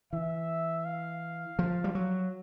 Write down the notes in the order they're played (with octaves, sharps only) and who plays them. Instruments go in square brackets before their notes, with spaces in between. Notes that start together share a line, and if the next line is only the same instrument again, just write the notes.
[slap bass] E3 [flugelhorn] E5
[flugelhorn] F5
[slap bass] F3
G3
F#3